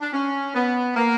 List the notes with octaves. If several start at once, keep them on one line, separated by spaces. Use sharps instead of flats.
D4
C#4
B3
A#3